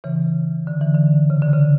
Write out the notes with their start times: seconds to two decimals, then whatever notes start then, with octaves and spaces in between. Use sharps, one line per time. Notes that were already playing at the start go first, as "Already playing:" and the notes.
0.04 C#3 E3
0.67 D3
0.81 E3
0.95 D3
1.30 C#3
1.42 D3
1.53 C#3